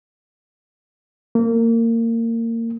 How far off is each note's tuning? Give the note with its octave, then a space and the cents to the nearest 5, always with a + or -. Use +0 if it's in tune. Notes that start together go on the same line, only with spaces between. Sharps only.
A#3 -25